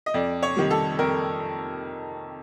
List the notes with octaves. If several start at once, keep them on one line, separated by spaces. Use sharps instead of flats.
D#5
F2 D5
C#5
C3 D#3 G3
A4
F2 A#4